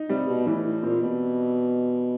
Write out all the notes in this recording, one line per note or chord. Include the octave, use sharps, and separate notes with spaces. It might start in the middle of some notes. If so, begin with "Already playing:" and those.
Already playing: D#4
C3 G3
B2
A2 E3
A2
A#2 C4
B2